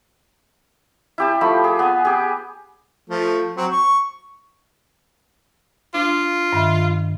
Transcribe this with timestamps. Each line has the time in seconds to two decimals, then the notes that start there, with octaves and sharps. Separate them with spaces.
1.18 E4 G4 A5
1.41 F3 A3 B5
1.64 G#4
1.79 B3 G#5
2.05 G4 G#4
3.10 F3 A3
3.57 F#3 C4
3.72 C#6
5.94 D4 F4
6.53 G2 D#3 E5